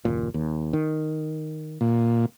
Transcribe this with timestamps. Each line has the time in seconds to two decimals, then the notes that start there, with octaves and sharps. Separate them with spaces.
0.05 F#1 D#2 A#2
0.34 D#2
0.73 D#3
1.81 A#2